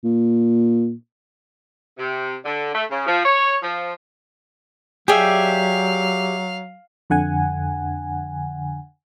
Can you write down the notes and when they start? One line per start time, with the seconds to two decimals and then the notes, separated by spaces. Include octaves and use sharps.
0.04 A#2
1.98 C3
2.44 D3
2.74 A3
2.89 C#3
3.06 F3
3.24 C#5
3.62 F3
5.08 F#3 G4 G#4 D5 E5 F5 G5 G#5
7.10 F2 D3 F#5 G#5